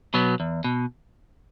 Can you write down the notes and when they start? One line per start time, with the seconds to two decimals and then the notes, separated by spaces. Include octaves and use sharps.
0.14 B2 F#3 B3
0.40 E2
0.64 B2